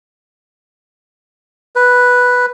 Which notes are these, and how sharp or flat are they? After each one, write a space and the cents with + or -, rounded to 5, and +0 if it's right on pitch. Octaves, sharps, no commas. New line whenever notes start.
B4 +0